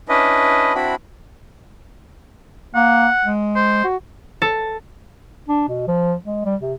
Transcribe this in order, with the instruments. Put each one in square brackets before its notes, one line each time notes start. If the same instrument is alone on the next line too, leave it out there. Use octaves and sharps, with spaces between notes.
[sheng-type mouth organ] C#4 D4 E4 B4 D#5
C4 D4 E4 F#4 B5
[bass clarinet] A#3 [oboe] F#5
[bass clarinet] G#3
[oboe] C5
[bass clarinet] F#4
[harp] A4
[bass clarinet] D4
B2
F3
G#3
G3
C3